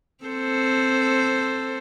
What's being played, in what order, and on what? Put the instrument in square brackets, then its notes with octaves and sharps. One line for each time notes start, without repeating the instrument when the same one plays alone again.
[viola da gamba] C4 A4 C5